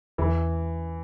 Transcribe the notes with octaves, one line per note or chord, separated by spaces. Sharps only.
E2 E3